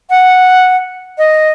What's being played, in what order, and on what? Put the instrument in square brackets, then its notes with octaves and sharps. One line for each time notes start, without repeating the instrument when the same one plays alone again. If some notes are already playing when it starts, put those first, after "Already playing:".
[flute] F#5
D#5